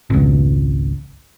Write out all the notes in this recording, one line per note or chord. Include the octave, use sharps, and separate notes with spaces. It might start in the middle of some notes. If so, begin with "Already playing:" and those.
G#1 C#2